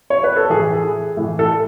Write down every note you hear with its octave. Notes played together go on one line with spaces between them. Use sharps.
C#5
B4
A4
A2 E3 A3 G#4
G#4
A2 E3 A3
A4